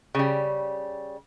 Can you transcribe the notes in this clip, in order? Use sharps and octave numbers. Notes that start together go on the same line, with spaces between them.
C#3 G3